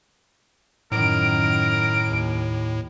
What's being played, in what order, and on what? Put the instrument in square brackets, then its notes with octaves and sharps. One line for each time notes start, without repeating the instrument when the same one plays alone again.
[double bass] F#2 D#3 [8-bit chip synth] A2 [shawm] A#4 [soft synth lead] D7
[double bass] D#2